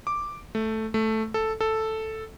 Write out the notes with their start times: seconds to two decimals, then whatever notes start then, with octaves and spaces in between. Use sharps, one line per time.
0.07 D6
0.55 A3
0.94 A3
1.34 A4
1.61 A4